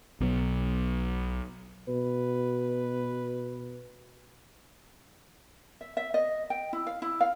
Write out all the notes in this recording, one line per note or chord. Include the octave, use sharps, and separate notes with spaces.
B1 B2 F#3
B2 B4
E5
E5
D#5
G5
E4
F5
E4
F5